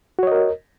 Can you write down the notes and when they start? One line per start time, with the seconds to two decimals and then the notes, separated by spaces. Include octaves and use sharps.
0.19 F#4
0.23 C#5
0.27 D#5
0.32 A#4